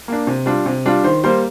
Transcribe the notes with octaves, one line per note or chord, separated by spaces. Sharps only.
A#3 D4
C3
G3 D4 F4
C3
G3 D4 F4
D#3 C5
G3 A#3 C5